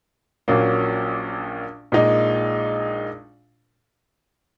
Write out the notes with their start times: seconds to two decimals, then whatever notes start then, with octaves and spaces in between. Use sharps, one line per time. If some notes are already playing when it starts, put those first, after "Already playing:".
0.48 A#1 A#2 F#3 A#3 C#4
1.92 A#1 A#2 G#3 D#4